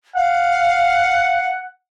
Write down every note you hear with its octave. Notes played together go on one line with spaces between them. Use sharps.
F5 F#5